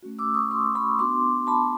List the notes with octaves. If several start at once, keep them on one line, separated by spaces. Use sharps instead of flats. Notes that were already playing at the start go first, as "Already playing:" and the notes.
A3 C#4 F#4
D6 E6
C#6 D#6
C6 D6
B5 C#6
B3 D4 F#4 C6 D6
A5 B5